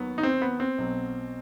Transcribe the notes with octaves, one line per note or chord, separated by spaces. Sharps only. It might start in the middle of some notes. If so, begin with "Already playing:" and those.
Already playing: D#2 D#3 F#3 B3
D#4
C4
B3
C4
B1 B2 F#3